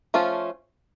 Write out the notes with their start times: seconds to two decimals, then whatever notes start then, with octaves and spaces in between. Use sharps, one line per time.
0.14 F3 A3 C#4 F4